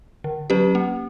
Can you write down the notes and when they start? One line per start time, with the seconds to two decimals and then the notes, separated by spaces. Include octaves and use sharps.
0.24 D3
0.50 F#3 C#4 G4 B4
0.75 A#3